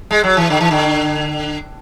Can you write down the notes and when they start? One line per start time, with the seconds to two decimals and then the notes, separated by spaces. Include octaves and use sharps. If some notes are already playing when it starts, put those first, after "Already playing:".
0.11 G#3
0.24 F#3
0.37 E3
0.50 D3
0.60 E3
0.71 D3